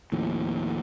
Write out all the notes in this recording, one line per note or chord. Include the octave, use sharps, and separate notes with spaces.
D#2 A2 F3